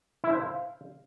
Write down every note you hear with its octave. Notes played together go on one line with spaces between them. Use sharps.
E4
C5
F5